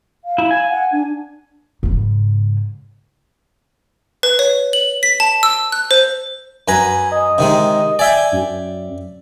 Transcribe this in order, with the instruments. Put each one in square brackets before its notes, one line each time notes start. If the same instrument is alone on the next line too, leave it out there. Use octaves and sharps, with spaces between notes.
[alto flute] F5
[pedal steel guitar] E4
G#5
[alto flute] F#5
D4
[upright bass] G#2 C#3
[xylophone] B4
C#5
F#7
B6
A5
E6
F#6
C5
[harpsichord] F#2 B4 A#5 [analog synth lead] G#5
[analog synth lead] D#5
[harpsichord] C3 D#3 G#3
[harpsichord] D5 E5 G5 [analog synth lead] G#5
[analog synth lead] F#2